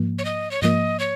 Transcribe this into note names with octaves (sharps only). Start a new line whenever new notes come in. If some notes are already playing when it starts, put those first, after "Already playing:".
Already playing: G#2 F3 A#3
C#5
D#5
C#5
G#2 F3 A#3 D#5
C#5